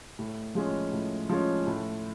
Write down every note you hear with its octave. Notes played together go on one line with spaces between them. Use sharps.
A2
F3 G#3 C#4
A2
F3 G#3 C#4
A2